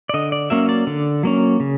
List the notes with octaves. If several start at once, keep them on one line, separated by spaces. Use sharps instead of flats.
D5
D3 D#5
D5
F#3 A#3 C#4 E5
D5
D3
F#3 A#3 C#4
C#3